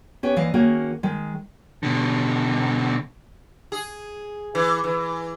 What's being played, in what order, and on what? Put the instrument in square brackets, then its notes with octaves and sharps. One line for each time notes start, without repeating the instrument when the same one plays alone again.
[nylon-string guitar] B3 C#4 G4
D#2 E3 D5 D#5 F5
D#3 A#3 C#4 F#4 G#4
D#3 G#3
[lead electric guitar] B2 D3
[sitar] G#4
E3
E3